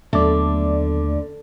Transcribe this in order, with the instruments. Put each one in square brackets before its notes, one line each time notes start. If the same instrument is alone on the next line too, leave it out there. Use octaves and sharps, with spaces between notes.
[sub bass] D#2 [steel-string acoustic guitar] D3 [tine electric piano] F#3 B3 [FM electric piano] A3 D5